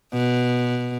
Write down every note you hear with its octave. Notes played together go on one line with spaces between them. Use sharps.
B2